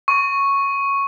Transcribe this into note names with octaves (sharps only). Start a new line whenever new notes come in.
C#6